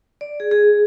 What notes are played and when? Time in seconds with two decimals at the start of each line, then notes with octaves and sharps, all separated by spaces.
0.21 D5
0.40 G#4
0.51 G#4